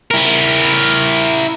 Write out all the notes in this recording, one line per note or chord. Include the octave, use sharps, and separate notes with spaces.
E4 A#4